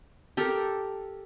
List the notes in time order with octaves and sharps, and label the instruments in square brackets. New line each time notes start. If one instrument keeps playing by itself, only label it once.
[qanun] G4 A4 A#4